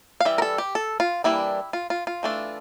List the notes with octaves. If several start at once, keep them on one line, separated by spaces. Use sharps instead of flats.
F5
E3 G3 E5
A#4
A4
G4
A4
F4
E3 G3 A#3 D4 E4
F4
F4
F4
E3 A3 D4